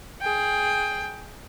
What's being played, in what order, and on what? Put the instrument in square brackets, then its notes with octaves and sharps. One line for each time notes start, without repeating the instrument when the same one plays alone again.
[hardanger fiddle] G#4 G5